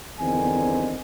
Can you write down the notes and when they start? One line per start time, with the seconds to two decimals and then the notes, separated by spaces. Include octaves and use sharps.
0.20 G1 E2 D3 D#3 C4 G#5